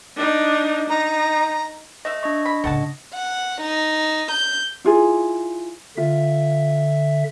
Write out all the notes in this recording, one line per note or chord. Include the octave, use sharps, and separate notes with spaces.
D4 D#4
D#4 A#5
A3 D#5 E5
D4 D#5 C#6
B5
A2 C#3 A4 F#5 A5
F#5
D#4
G6
E4 F4 G#4
D3 F4 E5